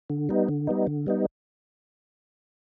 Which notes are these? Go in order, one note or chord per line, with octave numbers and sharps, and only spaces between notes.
D3
G3 B3 D#4
D3
G3 B3 D#4
D3
G3 B3 D#4